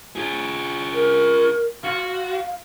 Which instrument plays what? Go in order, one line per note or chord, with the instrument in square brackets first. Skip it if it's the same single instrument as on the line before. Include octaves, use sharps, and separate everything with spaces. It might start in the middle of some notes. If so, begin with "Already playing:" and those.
[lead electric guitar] F4 G#4
[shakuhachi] A#4
[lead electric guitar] F#4 [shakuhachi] F5